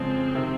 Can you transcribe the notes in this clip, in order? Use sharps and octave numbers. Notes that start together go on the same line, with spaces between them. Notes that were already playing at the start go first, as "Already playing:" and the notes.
Already playing: F2 C#3 F3 G#3 C4
C3 D#3